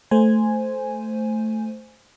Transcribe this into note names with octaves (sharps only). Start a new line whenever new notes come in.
A3 C5 G#5